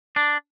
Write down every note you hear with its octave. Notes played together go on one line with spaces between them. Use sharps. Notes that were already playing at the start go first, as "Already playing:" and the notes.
D4